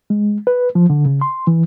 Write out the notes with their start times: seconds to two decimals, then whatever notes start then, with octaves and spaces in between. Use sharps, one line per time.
0.10 G#3
0.47 B4
0.75 F3
0.90 D3
1.06 C#3
1.21 C6
1.47 E3